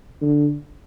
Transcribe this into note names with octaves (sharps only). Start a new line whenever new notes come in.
D3